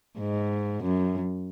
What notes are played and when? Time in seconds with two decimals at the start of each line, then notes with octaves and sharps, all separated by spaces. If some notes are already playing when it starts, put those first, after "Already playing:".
0.18 G#2
0.83 F#2